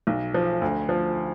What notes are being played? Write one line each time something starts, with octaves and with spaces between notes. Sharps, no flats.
B1
F3
D2
F3